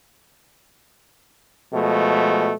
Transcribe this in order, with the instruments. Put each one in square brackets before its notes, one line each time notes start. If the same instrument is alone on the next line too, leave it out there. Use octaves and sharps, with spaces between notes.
[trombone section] B2 F3 G#3 A3